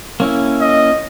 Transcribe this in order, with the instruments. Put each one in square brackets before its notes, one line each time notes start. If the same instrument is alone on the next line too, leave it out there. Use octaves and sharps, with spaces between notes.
[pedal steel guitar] A#3 C#4 E4
[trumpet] D#5